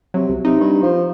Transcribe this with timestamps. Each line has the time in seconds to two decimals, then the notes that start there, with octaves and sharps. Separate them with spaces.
0.14 C3 F#3
0.29 C2
0.45 C3 D#4
0.60 G2
0.83 F3